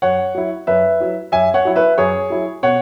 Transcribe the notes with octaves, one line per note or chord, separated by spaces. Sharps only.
F#2 C#5 F#5
F#3 E4
F#2 B4 E5
F#3 E4
F#2 E5 G#5
C#5 F#5
F#3 E4
B4 E5
F#2 G#4 C#5
F#3 E4
B2 C#5 F#5